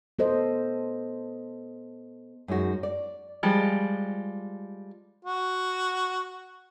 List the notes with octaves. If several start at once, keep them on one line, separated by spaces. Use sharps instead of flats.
B3 A4 C5 D#5
F#2 G#3 D#4 F#4
D5
F3 G3 G#3
F#4